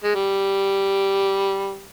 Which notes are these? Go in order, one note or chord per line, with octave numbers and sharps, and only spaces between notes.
G#3
G3